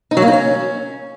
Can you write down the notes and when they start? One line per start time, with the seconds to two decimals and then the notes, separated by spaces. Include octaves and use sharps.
0.11 D#4
0.17 F#3
0.22 A#3
0.28 D#4
0.33 C#4